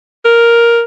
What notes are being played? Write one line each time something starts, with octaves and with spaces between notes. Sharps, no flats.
A#4